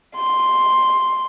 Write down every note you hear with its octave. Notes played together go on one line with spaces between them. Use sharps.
C6